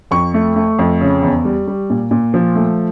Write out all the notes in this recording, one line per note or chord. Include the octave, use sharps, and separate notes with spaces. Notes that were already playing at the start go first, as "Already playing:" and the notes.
F2 C#6
A3
A3
F2
C#3
E2
G3
G3
A#2
A#2
F3
A3